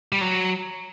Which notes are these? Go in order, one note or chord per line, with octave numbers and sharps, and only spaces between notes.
G3
F#3